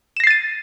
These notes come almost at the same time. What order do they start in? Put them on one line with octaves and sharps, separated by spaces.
E7 A#6 C7 A6 D#7